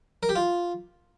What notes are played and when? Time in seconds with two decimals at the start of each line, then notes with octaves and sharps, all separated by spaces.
0.23 A#4
0.29 G4
0.36 F4